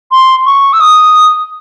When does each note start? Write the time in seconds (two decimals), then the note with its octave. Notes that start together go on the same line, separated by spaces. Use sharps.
0.12 C6
0.46 C#6
0.73 E6
0.80 D#6